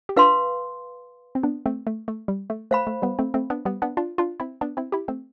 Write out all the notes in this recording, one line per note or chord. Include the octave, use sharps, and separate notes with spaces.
G4
D4 F4 B4 F5 C6
C4
B3 D4
A3 C4
A3
A3
G3
A3
A3 C5 F5 B5
A3
G3 B3
A3 C4
A3 C4
B3 D4
G3 B3
B3 D4
D4 F4
D4 F4
C4 E4
B3 D4
C4 E4
E4 G4
A3 C4